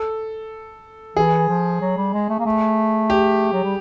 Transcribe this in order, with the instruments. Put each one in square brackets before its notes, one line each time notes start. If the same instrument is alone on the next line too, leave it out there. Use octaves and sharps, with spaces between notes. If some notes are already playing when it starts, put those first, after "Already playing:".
Already playing: [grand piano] A4
[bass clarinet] E3 [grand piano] G#4
[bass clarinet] F3
F#3
G3
G#3
A3
A#3
A3
[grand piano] G4
[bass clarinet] F#3
G3